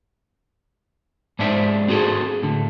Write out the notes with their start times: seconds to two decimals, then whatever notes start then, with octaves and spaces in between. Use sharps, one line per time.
1.39 G#2 D4 C5 E5 G5
1.88 C4 F#4 G#4 A4
2.43 A2 D3